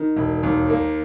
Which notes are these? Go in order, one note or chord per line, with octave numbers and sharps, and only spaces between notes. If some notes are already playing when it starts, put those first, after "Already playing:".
Already playing: D#3
E1
D#2
A#3